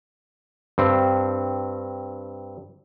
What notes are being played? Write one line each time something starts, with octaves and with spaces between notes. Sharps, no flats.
G2 C4